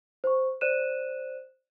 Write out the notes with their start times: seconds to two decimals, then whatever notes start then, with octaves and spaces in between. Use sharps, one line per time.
0.24 C5 C#6
0.61 C5 D5 F#6 D#7 E7